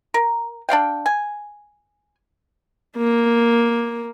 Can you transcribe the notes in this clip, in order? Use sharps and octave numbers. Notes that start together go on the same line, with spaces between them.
A#4
D4 D5 F5 G5
G#5
A#3